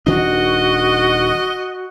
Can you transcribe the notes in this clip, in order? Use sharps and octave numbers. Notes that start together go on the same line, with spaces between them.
D#1 D#3 D4 F#4 D#5